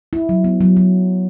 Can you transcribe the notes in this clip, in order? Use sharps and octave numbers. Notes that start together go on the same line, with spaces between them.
E4
F#3
B3
F#3
F#3